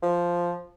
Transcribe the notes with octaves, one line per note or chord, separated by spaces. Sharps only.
F3